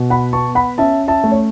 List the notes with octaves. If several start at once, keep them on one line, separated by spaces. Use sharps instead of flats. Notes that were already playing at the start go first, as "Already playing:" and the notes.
Already playing: B2
F#5 B5
B3 A5 C#6
F#5 B5
C#4 E5 A5
E5 A5
A3
C#5